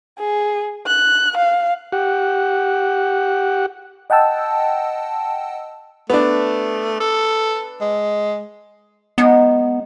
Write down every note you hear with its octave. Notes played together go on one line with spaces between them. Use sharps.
G#4
F#6
F5
G4 F#5
D#5 F#5 G5 A5 E6
A3 B3 D4
A4
G#3
F#3 G#3 B3 D#4